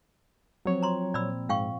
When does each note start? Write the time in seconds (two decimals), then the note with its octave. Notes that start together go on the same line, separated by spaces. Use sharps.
0.66 F3 F#3 C4 C#5
0.83 A#5 C6
1.14 A#2 D5 B5 E6
1.49 G#2 F5 G5 C#6